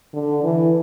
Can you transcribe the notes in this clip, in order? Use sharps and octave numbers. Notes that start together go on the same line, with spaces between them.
D3
E3